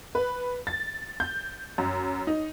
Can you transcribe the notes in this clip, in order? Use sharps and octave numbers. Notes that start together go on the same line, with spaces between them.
B4
A6
G6
F#2
D#4